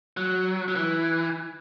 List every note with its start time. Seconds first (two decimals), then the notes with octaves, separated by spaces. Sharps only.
0.17 F#3
0.68 F#3
0.75 E3